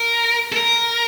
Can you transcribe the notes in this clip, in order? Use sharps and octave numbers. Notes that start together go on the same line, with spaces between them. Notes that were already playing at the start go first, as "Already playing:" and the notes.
Already playing: A#4
A4
A#4